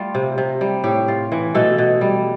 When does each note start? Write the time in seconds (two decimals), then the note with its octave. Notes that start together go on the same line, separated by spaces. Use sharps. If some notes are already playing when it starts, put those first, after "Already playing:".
Already playing: G3 A3 F4
0.15 C3
0.38 C3
0.61 G3
0.84 A2 G4
1.08 F4
1.32 E3
1.55 B2 A3 A4
1.78 B2
2.01 G3